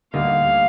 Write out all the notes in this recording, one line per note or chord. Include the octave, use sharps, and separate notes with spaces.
D2 D3 G3 A#3 D#4 F5